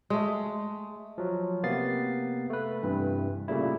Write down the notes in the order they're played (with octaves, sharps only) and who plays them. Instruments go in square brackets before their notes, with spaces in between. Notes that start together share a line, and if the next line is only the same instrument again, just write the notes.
[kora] G#3 A3
[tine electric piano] F3 F#3
C3 A#3 B3 A6 C7
A3 B4
G2 C3 E3
A#2 C#3 G3 A3 E4